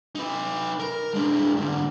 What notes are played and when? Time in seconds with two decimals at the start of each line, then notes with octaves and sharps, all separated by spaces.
0.15 D#4 B4
0.80 A#4
1.14 G#3 D4
1.56 G#2 D3